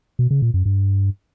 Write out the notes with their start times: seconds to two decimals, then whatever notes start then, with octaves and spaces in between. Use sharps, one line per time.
0.19 B2
0.31 C#3
0.42 A#2
0.54 F#2
0.66 G2